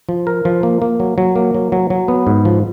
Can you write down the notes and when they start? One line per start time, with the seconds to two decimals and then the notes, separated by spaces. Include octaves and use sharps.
0.09 F3
0.27 A#4
0.45 F3
0.63 A#3
0.82 A#3
1.00 F#3
1.18 F#3
1.36 A#3
1.54 F#3
1.72 F#3
1.90 F#3
2.08 B3
2.27 G#2
2.45 F3